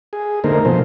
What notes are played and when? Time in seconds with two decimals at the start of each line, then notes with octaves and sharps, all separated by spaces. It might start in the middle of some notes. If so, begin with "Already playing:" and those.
0.13 G#4
0.44 D3 A3 A#3 D#4 A#4 C5
0.65 B2 F3 C5